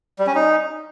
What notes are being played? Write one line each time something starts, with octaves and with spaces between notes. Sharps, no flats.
G3
C#4
D#4